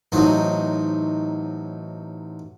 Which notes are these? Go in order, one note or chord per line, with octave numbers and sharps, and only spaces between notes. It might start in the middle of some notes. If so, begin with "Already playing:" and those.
A1 F#3 C4 D#4